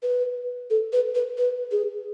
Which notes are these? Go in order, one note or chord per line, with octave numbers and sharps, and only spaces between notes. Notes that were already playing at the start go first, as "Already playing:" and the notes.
B4
A4
B4
B4
B4
G#4